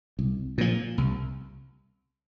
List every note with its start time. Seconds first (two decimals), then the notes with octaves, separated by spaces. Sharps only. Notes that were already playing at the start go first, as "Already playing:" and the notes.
0.19 C2
0.58 A#2 F3
0.98 C2